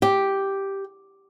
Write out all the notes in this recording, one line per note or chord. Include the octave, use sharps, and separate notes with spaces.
G4